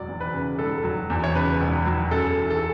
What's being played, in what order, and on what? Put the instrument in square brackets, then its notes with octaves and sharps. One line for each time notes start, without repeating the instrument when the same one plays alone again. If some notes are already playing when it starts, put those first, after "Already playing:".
Already playing: [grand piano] E1 F#3 D5
E2
B4
C#3
E1 A4
F#3
E2
C#5
C#3 B4
E1
F#3
F#2 A4
E3
A4